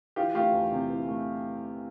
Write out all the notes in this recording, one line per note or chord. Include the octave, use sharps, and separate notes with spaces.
E3 F4 G4
A3 F4 G4
E2
C3
E3
A3